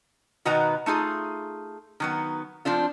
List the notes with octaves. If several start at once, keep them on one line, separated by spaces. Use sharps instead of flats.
B2 D#3 B3 F#4 D#5 A#5
A3 D#4 F4 G#4
D#3 F#3 B3
F3 C4 D4 F4